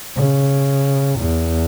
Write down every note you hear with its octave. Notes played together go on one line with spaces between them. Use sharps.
C#3
E2